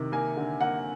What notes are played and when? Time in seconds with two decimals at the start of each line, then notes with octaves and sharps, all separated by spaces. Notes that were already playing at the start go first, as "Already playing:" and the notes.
Already playing: C3 D#3
0.12 A#3 G#5
0.37 D3
0.61 A#3 F#5